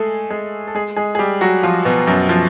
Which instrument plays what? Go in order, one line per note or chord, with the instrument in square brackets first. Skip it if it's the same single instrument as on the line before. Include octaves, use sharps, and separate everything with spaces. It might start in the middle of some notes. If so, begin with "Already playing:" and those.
Already playing: [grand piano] G#3 A3 G#4 A4
G#3 G#4
A4
G#3 G#4
G#3 G#4
G#4
G3 G4
F#3 F#4
F3 F4
B2 B3
F#2 F#3
F3